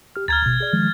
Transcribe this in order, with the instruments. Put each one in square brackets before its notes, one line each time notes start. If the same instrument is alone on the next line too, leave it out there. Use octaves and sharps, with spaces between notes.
[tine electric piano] G4 F6
[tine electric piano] D2 A#5 [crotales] F6 G#6 A6
[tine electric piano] G#1 B2
G#4 D5
D#3 F3 G#3